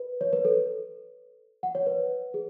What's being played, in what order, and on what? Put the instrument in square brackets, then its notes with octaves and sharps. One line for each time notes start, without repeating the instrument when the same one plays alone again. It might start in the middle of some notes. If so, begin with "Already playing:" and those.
Already playing: [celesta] B4
C#5
B4
A4
F#5
C#5
B4
G#4